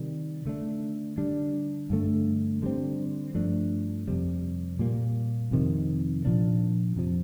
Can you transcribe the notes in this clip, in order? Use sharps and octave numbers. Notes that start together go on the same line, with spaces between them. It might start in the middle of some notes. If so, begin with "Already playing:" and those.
Already playing: C3 D#3 G3
D3 A3 D4
D3 G3 D4
G2 D3 A3
D3 G3 C4
G2 F3 A3 D4
F2 C3 G3
A#2 G3 A#3
F2 C3 D#3
A#2 F3 A#3 D4
F2 C3 F3